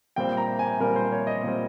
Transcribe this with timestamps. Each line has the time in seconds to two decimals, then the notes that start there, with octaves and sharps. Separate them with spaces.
0.16 A#2 G3 C4 G5
0.37 A#5
0.59 G#5
0.79 A#2 G3 C4 A#4
0.96 C5
1.12 C#5
1.27 D#5
1.43 A#2 G3 C4